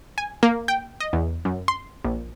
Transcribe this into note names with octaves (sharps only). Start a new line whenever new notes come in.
G#5
A#3
G5
D#5
E2
F#2
C6
A#1